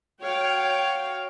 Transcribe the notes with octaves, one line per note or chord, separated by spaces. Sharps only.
F#4 C#5 F5 G5